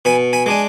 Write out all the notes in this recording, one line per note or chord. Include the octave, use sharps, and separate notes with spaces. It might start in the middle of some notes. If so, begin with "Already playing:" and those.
B2 G#5 B5
G#5 B5
G#3 D4 G#5